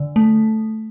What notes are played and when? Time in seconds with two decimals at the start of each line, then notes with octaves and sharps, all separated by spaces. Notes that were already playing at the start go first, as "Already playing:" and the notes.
Already playing: D3
0.16 A3